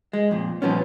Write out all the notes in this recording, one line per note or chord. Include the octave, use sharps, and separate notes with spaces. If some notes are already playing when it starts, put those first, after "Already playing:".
G#3
F2 A#2
A#2 F3 G3 B3 C#4